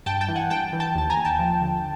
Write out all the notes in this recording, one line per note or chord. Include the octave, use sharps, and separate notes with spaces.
G2 G5 A5
G5 A5
E3
F#5 G#5
G2 G5 A5
E3
G5 A5
D#2 A5
G#5 A#5
D#2
G5 A5
F3
D3